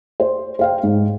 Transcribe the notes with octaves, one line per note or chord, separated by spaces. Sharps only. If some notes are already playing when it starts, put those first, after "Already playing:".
C5
C5 F5 G5
G#2